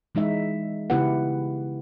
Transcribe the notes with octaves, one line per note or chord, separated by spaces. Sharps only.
E3 G#3 D#4 E5
C#3 B3 E4 G4 B4 F#5